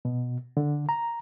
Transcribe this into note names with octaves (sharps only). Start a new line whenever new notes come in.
B2
D3
A#5